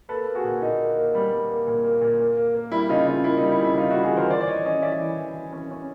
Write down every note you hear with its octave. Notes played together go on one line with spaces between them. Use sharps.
A#3 A4 B4
A#3
F#4 G#4
A#2
A#2 D#4
A#3
A#3
G3
G3
A#3
A#2
A#3
A#2
A#3
A#3
A#3
G3 E4
C#3 D#4 F4
C#3 D#4 F4
A#3 E4
D#4
G3
E4
C#3
E4
G3 D#4 F4
E4 F#4
G3
F#4 G#4
E3 A#4 C5
E3 C5 D5
D5
E3 C#5 D#5
C#4 C#5 D#5
E3 D5 E5
E3
E3
E3
C#4
C#4